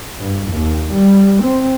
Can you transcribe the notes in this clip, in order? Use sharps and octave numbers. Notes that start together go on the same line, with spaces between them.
G2
D#2
G3
C4